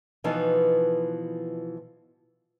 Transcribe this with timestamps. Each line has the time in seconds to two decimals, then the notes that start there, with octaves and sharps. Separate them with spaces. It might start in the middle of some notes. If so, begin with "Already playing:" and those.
0.24 B2 E3 F3 B3 D#4